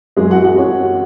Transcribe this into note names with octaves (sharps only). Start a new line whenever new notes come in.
F#2 F#3 G#3 G#4
F#4 F#5
F#4 F#5
C#4 C#5